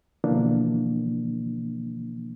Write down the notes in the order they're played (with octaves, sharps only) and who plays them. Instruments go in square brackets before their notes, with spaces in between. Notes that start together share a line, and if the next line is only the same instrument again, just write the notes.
[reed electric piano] B2 D3 E3 F3 A#3 D4